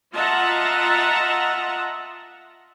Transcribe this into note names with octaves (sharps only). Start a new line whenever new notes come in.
F4 D#5 E5 F#5 A5 A#5